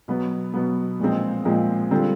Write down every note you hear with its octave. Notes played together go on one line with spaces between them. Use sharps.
B2 F#3 B3
B2 F#3 B3
A#2 F3 G#3 C4
A#2 F3 G#3 C4
D3 G3 C4 F4